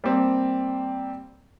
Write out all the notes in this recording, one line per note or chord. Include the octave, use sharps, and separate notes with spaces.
G3 A#3 C4